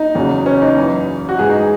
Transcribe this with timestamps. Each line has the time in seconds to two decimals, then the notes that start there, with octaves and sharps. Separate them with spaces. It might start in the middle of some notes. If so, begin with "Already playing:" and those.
Already playing: D#4
0.15 E2 C#3 F#3
0.46 C#4
0.62 D#4
0.77 F#2 E3
1.29 F#4
1.39 G#2 E3 G#4
1.49 D#4
1.59 G#4